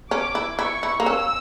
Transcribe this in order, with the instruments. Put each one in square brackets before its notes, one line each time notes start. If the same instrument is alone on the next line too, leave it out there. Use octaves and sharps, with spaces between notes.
[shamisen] C#4 [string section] D6
[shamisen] E4
[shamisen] E4 [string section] C#6
[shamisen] E4
A#3
[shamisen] C#4 [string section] E6